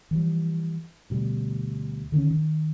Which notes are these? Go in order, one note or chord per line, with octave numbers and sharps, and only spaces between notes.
E3 F3 G3
D2 B2 G3
D3 D#3 A3 C#4
D#3